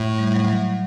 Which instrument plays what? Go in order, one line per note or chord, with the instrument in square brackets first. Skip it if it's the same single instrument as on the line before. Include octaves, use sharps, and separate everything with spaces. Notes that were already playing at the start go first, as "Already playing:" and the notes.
Already playing: [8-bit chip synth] A2
[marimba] G3
F#3
F#3